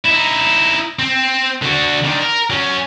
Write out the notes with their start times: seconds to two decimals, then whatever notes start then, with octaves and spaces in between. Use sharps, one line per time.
0.06 D#4 E4
0.99 C4
1.62 D3 F#4
2.04 D3 D#3
2.21 A#4
2.50 F#3 C#4